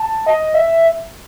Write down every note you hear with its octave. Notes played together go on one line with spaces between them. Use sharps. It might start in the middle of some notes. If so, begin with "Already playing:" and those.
Already playing: A5
D#5
E5